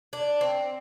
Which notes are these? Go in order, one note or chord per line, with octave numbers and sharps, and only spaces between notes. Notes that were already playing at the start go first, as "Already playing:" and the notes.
D4
C4